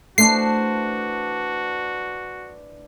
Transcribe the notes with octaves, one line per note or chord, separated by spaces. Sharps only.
E3 A3 D4 F#4 C5 C7